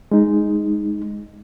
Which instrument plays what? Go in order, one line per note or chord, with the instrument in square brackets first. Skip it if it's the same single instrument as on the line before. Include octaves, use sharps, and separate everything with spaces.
[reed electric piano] G#3 D#4